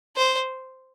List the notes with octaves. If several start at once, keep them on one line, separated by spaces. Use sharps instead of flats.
C5